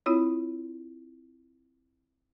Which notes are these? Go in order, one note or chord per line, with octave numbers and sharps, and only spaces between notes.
C4 E4 F4 C#5